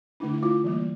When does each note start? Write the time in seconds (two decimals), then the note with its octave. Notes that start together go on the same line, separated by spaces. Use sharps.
0.20 D3 A3 D4 E4
0.33 E4
0.43 F4
0.64 E3 G3 A#3